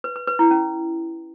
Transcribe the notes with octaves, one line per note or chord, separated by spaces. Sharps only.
B4
B4
B4
E4
C#4